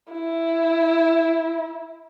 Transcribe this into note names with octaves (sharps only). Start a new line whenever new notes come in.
E4